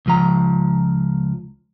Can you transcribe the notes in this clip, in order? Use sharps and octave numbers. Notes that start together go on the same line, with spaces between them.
C#2 F3 A#5